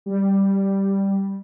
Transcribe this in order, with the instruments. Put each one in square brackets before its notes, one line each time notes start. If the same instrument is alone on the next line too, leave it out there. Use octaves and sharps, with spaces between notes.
[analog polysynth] G3